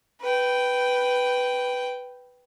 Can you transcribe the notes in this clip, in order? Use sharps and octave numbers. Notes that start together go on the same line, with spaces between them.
B4 G5